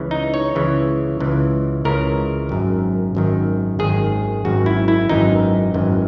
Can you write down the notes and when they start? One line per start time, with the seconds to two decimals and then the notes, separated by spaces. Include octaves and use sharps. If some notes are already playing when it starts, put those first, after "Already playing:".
Already playing: C#2 C#3 E3
0.11 D#4
0.34 C#5
0.56 C#2 C#3 E3
1.20 C#2 C#3 E3
1.85 C#2 C#3 E3 A#4
2.49 G#1 F#2 D#3
3.15 G#1 F#2 D#3
3.79 G#1 F#2 D#3 G#4
4.45 G#1 F#2 D#3 F#4
4.66 E4
4.88 E4
5.09 G#1 F#2 E3 D#4
5.74 G#1 F#2 E3